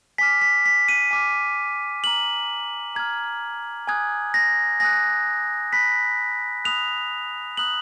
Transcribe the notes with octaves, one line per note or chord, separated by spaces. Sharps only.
G#5 D6 F6 B6
B6
B6
D#7
G#5 D6 F6
A#5 F6 F#7
A#5 F6 G#6
G#5 D#6 F#6 G#6
A#6
G#5 D#6 F#6 A#6
B5 D#6 F#6 B6
B5 D#6 F#6 F7
A#5 D#6 F#6 F#7